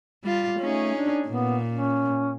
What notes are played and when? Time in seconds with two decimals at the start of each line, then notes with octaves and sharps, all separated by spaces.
0.24 G3 F4
0.59 A3 C#4 D#4 G#4
0.94 D4
1.28 A#2 B3
1.72 C#4